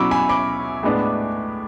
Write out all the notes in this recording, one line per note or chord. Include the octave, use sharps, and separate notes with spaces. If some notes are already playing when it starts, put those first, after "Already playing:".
Already playing: B2 F#3 C#4 E4 B5 C#6 D6 E6
G#5 B5
B5 D6
A2 G#3 B3 D4